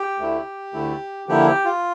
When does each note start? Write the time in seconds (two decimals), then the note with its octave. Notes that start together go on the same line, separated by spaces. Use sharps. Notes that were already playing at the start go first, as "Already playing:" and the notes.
Already playing: G4
0.18 D2 D3 A3 E4
0.74 D2 D3 A3 E4
1.28 D3 F3 A#3 E4 G4
1.47 G4
1.65 F4